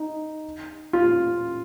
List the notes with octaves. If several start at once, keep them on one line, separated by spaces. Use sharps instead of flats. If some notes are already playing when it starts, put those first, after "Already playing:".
Already playing: D#4
F4